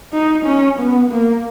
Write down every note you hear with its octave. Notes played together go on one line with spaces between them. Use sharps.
D#4
C#4
B3
A#3